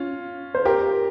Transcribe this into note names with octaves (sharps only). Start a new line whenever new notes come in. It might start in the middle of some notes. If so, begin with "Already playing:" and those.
Already playing: C#4 F4
C5
G4 A#4